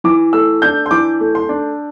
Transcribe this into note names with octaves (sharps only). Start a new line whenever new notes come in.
E3 D6
A3 E6
D4 G6
C6
E3 D6
A3
C6
D4